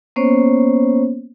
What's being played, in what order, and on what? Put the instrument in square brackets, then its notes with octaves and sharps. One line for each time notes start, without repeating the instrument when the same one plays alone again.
[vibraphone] A#3 B3 C#4 C5 C#5